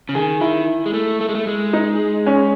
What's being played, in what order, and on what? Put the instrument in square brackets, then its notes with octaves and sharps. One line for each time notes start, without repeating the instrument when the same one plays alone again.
[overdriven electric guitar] C#3
[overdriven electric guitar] D#3 [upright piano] G#4
[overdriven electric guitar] D#3 [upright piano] E4
[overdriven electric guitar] G#3
A3
A3
G#3
A3
G#3
[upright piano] D#4
C#4